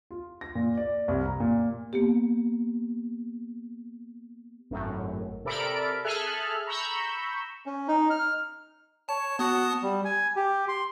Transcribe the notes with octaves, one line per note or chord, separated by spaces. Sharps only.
F4
A#6
A#2
D5
C2
A#5
A#2
A#3 B3 G4
G#1 F#2 A2
C3 A4 A#4 D5 B5 D7
G#4 A4 E5 G#5 F6 F#6
A#5 B5 C#6 E6 G6
C#4
D#4
F6
C#5 A5
B3 F#4 A5 D#6
G3
G#5
G4
C6